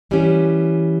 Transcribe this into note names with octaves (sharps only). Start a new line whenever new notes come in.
E3 G3 C#4